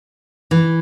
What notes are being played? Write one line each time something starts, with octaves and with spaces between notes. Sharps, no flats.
E3